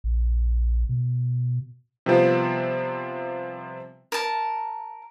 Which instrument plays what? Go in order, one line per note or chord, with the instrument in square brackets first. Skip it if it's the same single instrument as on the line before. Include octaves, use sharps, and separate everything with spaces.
[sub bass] A#1
B2
[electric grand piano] C3 F3 G3 B3 C4 F4
[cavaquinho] A#4 A5